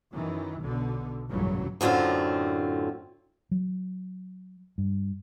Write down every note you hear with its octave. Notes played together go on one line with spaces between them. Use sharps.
F#2 D#3 E3
B1 B2 D3
F1 A#1 G2 C#3 E3 F#3
F#2 A2 D3 C4 F4
F#3
G2